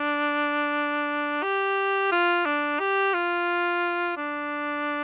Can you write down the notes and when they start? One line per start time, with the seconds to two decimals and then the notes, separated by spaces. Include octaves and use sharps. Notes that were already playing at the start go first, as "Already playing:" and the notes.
Already playing: D4
1.43 G4
2.11 F4
2.45 D4
2.79 G4
3.13 F4
4.17 D4